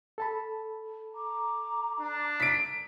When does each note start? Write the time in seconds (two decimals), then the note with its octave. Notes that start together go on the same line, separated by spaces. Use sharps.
0.18 A4 A5 B5
1.15 A#5 D6
2.00 D4
2.40 A#4 B6 D7